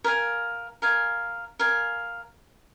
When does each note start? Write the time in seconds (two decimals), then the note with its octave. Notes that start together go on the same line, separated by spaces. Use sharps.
0.04 A#4 F5 G#5
0.82 A#4 F5 G#5
1.59 A#4 F5 G#5